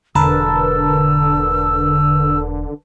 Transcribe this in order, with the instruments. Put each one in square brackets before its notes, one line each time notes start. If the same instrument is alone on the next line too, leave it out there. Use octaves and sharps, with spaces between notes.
[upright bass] E1 [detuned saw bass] D3 [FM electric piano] A#4 B4 A5 [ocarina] E6